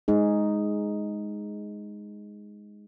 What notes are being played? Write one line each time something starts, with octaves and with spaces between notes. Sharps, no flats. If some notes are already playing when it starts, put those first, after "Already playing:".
G#3 D#4 G#4